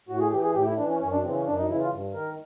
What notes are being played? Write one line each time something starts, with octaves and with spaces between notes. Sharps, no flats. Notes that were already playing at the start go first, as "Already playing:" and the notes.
A2 F#4
G#4
E3 G4
G#4
A2 G4
E4
E3 D4
C#4
F#2 C#4
D4
C#3 E3 C4
C#4
F#2 D4
D#4
C#3 E3 E4
F4
G2
D#3 A#4